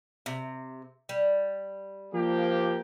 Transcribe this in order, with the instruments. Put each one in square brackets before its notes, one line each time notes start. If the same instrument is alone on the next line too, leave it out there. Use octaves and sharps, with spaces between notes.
[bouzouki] C3
G3
[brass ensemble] F3 A#3 G4